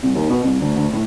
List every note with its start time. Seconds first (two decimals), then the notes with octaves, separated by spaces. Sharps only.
0.02 C2
0.15 D#2
0.30 B2
0.43 C2
0.61 D2
0.76 D2
0.93 A2